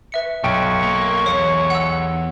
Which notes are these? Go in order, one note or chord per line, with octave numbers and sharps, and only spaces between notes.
B4 E5 C#7
B1 G2 G5 C#6 D7
A#3
E2 C#5
F#5 E6